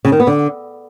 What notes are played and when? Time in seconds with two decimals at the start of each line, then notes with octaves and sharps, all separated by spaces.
0.05 C#3
0.12 D#3
0.20 B3
0.27 D3